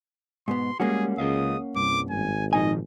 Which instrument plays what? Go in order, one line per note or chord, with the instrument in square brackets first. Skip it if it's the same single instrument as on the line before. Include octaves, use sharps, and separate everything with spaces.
[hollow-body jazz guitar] G#2 B2 B3 [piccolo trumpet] C6
[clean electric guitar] G3 G#3 [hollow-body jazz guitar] A#3 C#4 F#4 [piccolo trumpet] G#4
[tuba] C#2 [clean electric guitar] G#4 D#5 F5 [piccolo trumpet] D#6
[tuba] C2 [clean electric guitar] G2 [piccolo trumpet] D6
[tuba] G#1 [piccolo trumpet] G#5
[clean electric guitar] A#2 D#3 F3 [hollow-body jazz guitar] D#4 G#5 [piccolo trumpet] D#5